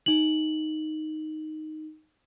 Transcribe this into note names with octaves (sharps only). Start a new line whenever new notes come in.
D#4 F#7